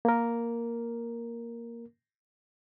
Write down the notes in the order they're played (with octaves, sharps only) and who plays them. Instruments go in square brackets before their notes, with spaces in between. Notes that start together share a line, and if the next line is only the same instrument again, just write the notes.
[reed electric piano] A#3 A#4